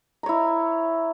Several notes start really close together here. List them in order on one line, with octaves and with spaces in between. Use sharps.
A#5 C#5 E4